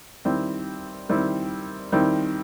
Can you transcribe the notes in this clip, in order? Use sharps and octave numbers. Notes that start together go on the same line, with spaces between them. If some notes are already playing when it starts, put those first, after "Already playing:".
D#3 G3 C4 E4
D#3 G3 C4 E4
D#3 G3 C4 E4